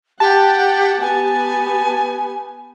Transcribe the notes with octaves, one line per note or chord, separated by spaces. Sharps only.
G4 F#5 A5
B3 G4 G#5